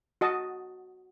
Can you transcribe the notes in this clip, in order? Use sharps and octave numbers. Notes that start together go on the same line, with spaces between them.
F#4 D#5 A5